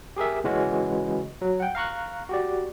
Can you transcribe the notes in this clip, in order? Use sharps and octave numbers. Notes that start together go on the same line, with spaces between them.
G4 G#4 A#4 E5
C#3 E3 G#3 C#4 F#4
F#3
F#5 G5
F5 A#5 C#6 F#6
F#4 G4 D5